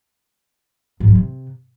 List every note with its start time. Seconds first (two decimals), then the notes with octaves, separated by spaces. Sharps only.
1.00 G#2
1.08 F#3
1.15 C3